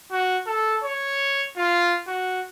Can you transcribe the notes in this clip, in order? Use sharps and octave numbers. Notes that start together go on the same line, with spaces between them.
F#4
A4
C#5
F4
F#4